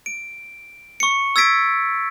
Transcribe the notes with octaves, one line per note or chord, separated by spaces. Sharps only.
D7
C#6 C#7
E6 G#6 A6 B6 D7